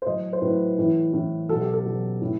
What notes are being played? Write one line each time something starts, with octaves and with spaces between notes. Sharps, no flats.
C5
A2 F#3 D#5
C5
A2 F#3 B4
A2 E3
A2 E3
B2 F#3 A4
G4
A4
B2 F#3
A2